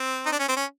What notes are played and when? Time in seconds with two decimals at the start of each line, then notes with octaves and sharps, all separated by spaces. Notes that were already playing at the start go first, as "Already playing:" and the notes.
Already playing: C4
0.26 D#4
0.32 D4
0.39 C#4
0.49 C4
0.57 C#4